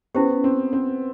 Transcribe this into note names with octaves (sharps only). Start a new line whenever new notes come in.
B3 C#4 E4 G4 C5
C4
C4